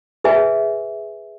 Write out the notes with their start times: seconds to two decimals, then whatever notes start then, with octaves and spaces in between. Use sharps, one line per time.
0.24 G#4 B4 E5 G#5